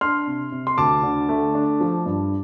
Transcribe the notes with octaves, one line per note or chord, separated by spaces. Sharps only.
D4 C6 F6
C3
C3
C6
D2 A5 D6
D3
A3
D4
F3
G2